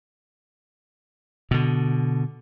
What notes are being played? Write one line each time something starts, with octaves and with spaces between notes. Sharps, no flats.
B2 D3